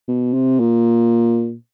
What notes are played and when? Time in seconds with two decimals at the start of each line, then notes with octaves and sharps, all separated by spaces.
0.08 B2
0.34 C3
0.60 A#2